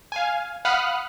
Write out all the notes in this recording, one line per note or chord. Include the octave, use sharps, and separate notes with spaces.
F5 G#5
F5 F#5 B5 D#6 F6 F#6